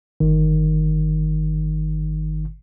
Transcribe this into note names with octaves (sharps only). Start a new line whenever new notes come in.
G1 D#3